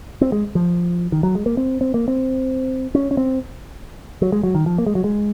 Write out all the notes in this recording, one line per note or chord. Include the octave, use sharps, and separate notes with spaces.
C4
G#3
F3
D#3
F#3
G#3
A#3
C4
C4
A#3
C4
C#4
C#4
C4
F#3
G#3
F#3
D#3
F3
A#3
G#3
F#3
G#3